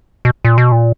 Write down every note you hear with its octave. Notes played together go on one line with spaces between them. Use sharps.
B2
A#2
B2
A#2